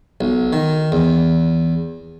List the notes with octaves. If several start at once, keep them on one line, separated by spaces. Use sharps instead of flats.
B1
D#3
E2